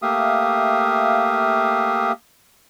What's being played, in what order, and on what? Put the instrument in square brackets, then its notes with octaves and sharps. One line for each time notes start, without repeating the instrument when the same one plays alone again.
[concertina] A3 A#3 G4 E5 F5 D#6